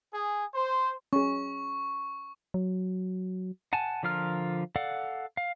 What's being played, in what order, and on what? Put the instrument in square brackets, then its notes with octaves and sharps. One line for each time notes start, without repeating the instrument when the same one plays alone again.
[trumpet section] G#4
C5
[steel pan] C#4 G#4 [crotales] C#6
[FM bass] F#3
[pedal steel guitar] F#5 G#5 A5
D3 F3 F4 A#4 F6
A4 D5 F5 F#5
F5